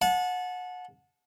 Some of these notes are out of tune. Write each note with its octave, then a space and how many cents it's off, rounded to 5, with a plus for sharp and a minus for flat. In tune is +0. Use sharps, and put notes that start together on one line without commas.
F#5 -30 A5 -25